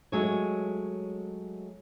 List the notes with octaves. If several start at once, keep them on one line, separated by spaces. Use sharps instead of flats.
F#3 G#3 A3 C#5